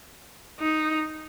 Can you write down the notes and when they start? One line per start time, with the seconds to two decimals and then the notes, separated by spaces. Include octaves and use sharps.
0.59 D#4